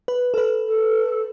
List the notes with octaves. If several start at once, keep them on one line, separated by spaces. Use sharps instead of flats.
B4
A4
B4
A4